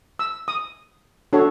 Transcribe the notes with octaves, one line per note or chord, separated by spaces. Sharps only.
E6
D#6
D4 F#4 A4 C#5